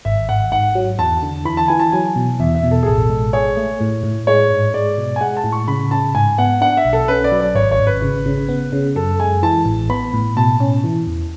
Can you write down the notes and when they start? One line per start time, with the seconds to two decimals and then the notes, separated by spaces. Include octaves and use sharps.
0.05 G#1 E5
0.29 G#1 F#5
0.52 G#2 F#5
0.75 F#3
0.99 E2 A5
1.22 D3
1.45 E3 B5
1.57 A5
1.68 E3 G#5
1.80 A5
1.92 F#3 G#5
2.16 B2
2.40 E2 E5
2.55 E5
2.63 B2
2.71 A4
2.83 G#4
2.86 A1 A4
3.10 G#3
3.33 G#4 C#5
3.57 A3
3.81 A2
4.03 A2
4.27 G#3 C#5
4.50 G#2
4.74 G#3 D5
4.98 B2
5.16 G#5
5.21 G#3 F#5
5.37 A5
5.44 A2
5.52 C#6
5.68 C#3 B5
5.91 C#3 A5
6.15 G#2 G#5
6.38 B3 F#5
6.61 D4 F#5
6.77 E5
6.85 B1
6.93 A4
7.08 C#4 B4
7.24 D5
7.32 F#3
7.40 D5
7.55 G#1 C#5
7.71 C#5
7.79 G#1
7.87 B4
8.02 C#3
8.26 C#3
8.49 B3
8.73 C#3
8.96 F#2 A4
9.19 G#3 G#5
9.43 E3 A5
9.66 A1
9.90 B3 B5
10.13 A2
10.37 B2 A5
10.60 C#4
10.84 E3
11.07 E2